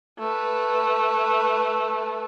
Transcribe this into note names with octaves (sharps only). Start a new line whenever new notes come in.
A3 B4